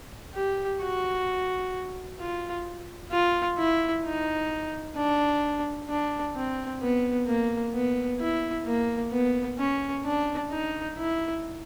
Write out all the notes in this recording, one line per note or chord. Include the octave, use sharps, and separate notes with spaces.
G4
F#4
F4
F4
E4
D#4
D4
D4
C4
B3
A#3
B3
E4
A#3
B3
C#4
D4
D#4
E4